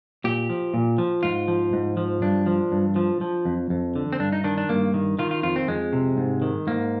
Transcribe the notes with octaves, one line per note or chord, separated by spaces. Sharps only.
A#2 G4
F3
A#2
F3
G#2 F4
F3
G#2
F3
G2 D4
F3
G2
F3
F3
F2
F2
D3
C4
G2 D4
D#4
D#3 D4
D4
G2 A#3
D#3
D#3 F4
F4
F2 F4
C4
F2 G#3
C3
G#2
D#3
G#2 A#3